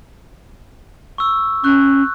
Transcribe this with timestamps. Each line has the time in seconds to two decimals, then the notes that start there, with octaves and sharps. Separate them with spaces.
1.18 C#6 E6
1.64 C#4 C#6 F#6 G6